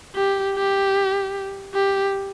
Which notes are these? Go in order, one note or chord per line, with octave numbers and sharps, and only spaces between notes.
G4
G4
G4